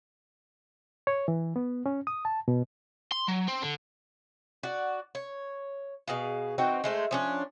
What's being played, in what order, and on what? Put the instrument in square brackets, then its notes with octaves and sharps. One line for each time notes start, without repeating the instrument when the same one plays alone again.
[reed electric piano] C#5
E3
B3
C#4
D#6
A5
B2
[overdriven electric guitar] C6
F#3
C4
D3
[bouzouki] F#4 D5
C#5
B2 G#4 F5
E3 C4 D#4 F#4
G#3 A3 C5
F3 C#4 D4